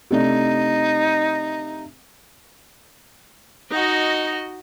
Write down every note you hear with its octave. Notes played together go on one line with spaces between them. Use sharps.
C3 A3 D4 D#4
D#4 F#4 D#5